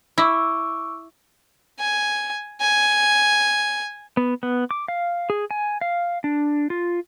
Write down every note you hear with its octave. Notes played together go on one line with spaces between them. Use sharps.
E4 C#6 D6 E6
G#5
G#5
B3
B3
D6
F5
G#4
G#5
F5
D4
F4